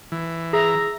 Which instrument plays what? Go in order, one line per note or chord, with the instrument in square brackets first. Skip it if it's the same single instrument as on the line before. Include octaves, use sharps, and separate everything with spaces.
[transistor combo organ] E3
[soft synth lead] G#4 [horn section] E5 A#5